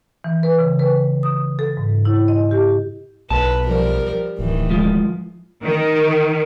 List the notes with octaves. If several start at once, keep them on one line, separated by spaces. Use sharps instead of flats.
E3
B4
C#3
B4
D#6
A4
G#2
E4
D#5
G4
B1 B4 A5
F3 G3 A#4
D1 A2 D#3 E3
F3 G#3 F4
D#3